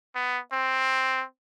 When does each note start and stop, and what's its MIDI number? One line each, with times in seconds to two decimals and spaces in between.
0.15 0.39 59
0.52 1.24 60